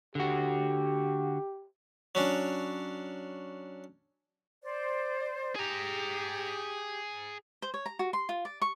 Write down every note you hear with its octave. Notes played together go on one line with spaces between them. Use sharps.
D3 F#4 G4
F#3 C#4 D4
C5 D5
G4 G#4 A#5
C5
C#5
A#5
F#4
C6
F4
D5
C#6